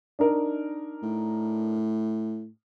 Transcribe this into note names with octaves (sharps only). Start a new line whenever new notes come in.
D4 D#4 A#4
A2